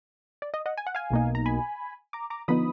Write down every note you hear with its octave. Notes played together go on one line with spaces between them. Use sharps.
D5
D#5
D#5 F#5
G#5
F#5
F5 G#5
B1 B2 A#3 D#4
A#5
G#5 B5
A#5 D6
A#5 D6
D3 F3 B3 D#4 B5 D#6